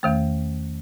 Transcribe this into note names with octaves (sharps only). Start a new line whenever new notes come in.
E2 D#3 A3